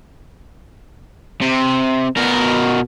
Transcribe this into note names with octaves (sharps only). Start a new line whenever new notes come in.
C3
B2 A#4